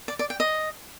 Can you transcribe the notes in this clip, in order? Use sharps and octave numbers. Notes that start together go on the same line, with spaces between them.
D5
D5
G5
D#5